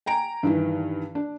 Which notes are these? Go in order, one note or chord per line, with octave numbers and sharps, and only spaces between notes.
G5 G#5 A#5 D7
G2 D#3 E3
D4